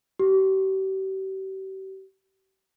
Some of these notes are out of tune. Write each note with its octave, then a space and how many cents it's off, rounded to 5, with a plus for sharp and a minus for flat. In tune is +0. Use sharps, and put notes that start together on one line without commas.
G4 -40